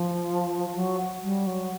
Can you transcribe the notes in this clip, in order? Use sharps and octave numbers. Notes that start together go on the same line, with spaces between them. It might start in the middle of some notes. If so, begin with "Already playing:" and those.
Already playing: F3
F#3
G3
F#3